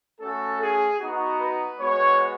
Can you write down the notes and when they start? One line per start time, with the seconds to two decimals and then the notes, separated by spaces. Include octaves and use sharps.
0.21 A3 C#4 F#4 A4
0.61 G#4
1.00 B3 D#4 F#4
1.40 B4
1.79 G#3 B3 F#4 C#5